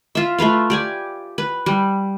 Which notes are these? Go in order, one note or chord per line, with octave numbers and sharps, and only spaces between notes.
F4 E5
A3 F4 B4 F5
G4 D5 G#5
B4
G3